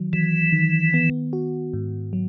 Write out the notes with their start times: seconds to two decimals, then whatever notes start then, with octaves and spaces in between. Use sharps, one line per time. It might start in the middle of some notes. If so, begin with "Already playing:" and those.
Already playing: D#3 F#3
0.13 E3 F#3
0.53 D#3
0.94 B3
1.33 F#4
1.73 G#2
2.13 F#3